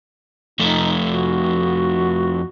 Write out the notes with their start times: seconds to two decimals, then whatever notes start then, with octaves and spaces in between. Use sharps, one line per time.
0.60 F2 A3 D#4
1.11 F#4